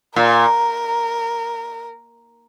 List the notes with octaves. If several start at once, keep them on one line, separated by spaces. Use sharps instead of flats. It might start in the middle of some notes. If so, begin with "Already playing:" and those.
A#2 A#4